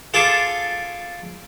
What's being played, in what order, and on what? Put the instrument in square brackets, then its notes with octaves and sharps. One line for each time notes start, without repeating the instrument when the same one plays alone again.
[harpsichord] F4 G#4 A4 A5 D6